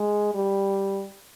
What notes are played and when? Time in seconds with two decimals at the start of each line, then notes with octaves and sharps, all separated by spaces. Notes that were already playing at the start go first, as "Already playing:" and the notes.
Already playing: G#3
0.34 G3